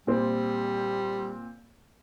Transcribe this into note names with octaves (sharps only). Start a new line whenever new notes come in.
A#2 G3 C4